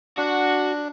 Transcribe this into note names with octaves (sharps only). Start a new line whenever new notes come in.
D4 F#4